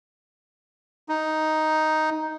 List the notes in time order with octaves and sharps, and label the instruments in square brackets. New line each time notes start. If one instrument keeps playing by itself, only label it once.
[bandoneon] D#4